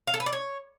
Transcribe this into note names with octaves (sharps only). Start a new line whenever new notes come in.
F5
A4
B4
D5
C#5